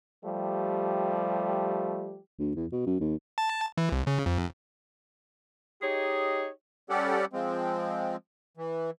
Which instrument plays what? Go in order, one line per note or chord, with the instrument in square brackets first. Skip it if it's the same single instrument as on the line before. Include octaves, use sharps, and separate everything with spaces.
[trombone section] F3 G3 A3 G4
[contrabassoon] D2
E2
B2
F#2
D#2
[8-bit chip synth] A5
E3
C2
C#3
F2
[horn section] D#4 G4 G#4 C#5 D#5
[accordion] G3 C#4 G4 A4 D5 F#5
F3 G#3 C4
E3